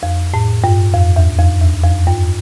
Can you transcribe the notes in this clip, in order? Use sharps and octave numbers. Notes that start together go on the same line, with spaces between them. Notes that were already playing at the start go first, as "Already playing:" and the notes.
F2
A2
G2
F2
E2
F2
E2
F2
G2